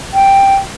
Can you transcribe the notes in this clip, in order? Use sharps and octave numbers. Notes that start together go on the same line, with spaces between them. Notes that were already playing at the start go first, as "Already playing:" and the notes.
G5